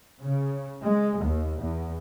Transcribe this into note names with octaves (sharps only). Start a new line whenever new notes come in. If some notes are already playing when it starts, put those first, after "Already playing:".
C#3
G#3
D#2
E2